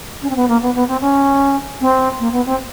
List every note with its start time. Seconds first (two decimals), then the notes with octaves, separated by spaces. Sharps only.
0.22 C#4
0.29 C4
0.36 B3
0.48 A#3
0.62 B3
0.75 B3
0.88 C4
1.01 C#4
1.80 C4
2.19 A#3
2.32 B3
2.46 C4